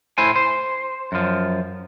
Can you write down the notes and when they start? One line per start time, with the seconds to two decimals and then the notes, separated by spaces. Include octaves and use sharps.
0.18 A2 E4 C5 G#5
0.36 C5
1.12 F#2 F3